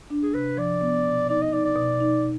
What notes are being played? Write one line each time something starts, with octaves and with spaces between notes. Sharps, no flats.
D4
G#4
C3 B4
F3 D5
B3
B2
D#4 D5
D#5
D#4 D5
D5
B2
D#4